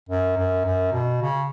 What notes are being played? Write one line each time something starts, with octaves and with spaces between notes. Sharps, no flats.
F#2
F#2
F#2
B2
C#3